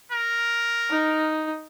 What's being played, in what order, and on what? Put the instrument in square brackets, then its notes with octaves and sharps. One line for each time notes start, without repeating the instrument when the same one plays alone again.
[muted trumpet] A#4
[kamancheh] D#4